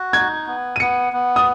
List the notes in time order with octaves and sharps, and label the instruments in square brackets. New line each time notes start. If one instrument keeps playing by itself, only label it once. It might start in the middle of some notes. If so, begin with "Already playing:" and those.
Already playing: [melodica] F#4
[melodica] D#4 [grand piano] G#6
[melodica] B3
[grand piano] D#7
[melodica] B3 [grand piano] C#7
[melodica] B3
[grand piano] D#6